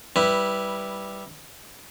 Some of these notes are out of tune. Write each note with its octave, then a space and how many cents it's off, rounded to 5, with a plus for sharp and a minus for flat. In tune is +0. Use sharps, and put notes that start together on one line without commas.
G3 +0 E4 -10 B4 +0